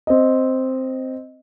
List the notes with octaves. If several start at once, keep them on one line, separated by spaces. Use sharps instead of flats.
C4 D#5